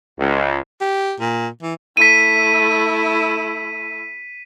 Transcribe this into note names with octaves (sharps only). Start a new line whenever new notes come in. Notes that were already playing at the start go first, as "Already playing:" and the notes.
C#2
G4
A#2
E3
A3 E4 B6 D#7